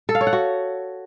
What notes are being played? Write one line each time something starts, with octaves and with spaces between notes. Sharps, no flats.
A4
F5
C#5
F#5
F#4